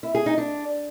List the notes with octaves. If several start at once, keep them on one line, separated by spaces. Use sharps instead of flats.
E4
G#4
D#4
D4